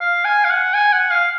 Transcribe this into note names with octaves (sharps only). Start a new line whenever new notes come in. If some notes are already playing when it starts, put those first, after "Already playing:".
F5
G#5
F5
F#5
G#5
F#5
F5